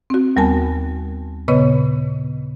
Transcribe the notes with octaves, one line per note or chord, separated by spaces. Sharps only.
C4 F#4
D#2 G3 B3 A#4 G#5 A5
A#2 C#3 B3 B4 C#5 D#5